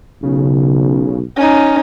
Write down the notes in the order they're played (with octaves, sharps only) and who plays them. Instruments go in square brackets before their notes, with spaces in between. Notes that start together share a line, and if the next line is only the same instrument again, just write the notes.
[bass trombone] B1 [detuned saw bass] C#3
[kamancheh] C#4 D#4